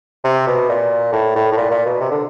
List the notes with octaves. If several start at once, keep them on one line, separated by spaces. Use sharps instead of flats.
C3
B2
A#2
A2
A2
A2
A#2
A#2
B2
C3
D3